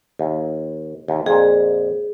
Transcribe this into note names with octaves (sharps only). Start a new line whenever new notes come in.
D#2
D#2
F2 A#2 G#4